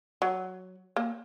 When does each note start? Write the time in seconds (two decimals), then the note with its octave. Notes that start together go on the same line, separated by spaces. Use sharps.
0.22 F#3
0.96 A#3